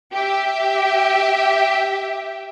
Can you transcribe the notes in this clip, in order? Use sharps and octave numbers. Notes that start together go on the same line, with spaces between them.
G4 E5